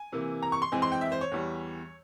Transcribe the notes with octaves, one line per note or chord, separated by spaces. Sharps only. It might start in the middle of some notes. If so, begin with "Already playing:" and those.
Already playing: G#5
C3 E3 A#3
A#5
C#6
C6
F2 E3 G#3 C4 G#5
C6
G5
E5
C5
C#5
E2 E3 G3